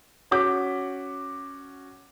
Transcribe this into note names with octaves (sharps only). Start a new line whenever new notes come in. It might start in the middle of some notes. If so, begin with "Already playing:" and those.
C#4 F#4 F#5 D6 G6 B6